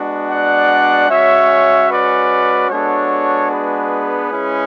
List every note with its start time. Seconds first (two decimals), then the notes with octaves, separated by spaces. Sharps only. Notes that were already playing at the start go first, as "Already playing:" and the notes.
Already playing: G#3 B3 D4 F#4
0.29 D5 F#5
1.09 G#3 C#4 F#4 C#5 E5
1.90 B4 D5
2.70 G#3 B3 D4 F#4 A4 C#5
3.50 G#4 B4
4.31 G#3 C#4 E4